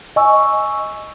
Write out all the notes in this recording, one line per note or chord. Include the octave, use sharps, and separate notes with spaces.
D#5 G#5 C#6 E6